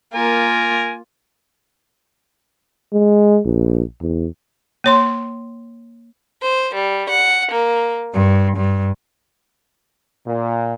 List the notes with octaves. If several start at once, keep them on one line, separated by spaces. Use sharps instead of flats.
A#3 F4 A#4 G#5
G#3
A#1
E2
A#3 C#5 C6
C5
G3
F#5
A#3
G2
G2
A#2